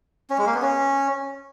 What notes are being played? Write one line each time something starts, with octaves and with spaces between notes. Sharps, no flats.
C#4
G#3
A#3
B3
C#4